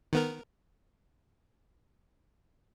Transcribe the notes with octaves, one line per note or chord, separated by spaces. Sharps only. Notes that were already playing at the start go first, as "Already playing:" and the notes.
D#3 B3 A#4